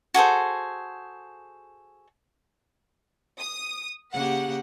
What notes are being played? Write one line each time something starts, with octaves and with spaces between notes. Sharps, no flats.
F#4 G#4 A4 C5
D#6
C#3 A#3 G4 F#5